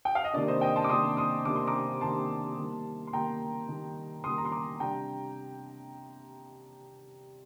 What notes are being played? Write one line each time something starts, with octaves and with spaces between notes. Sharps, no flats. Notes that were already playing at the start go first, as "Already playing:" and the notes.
G5
F5
D#5
C3 D#3 A#3 D4 D5
C5 D#5
D#5 G5
A5 C6
D6
C3 D#3 A#3 D4 C6 D#6
C6 D#6
C3 D#3 A#3 D4 D6
C6
A#5 D6
C3 D#3 A#3 D4 A5 C6
D#3 G3 A#3
C6
D#3 G3 A#3 G5 A#5
D#3 G3 A#3
D#3 G3 A#3 C6 D#6
A#5
C6
A#5 D6
C3 G3 D4 G5 A#5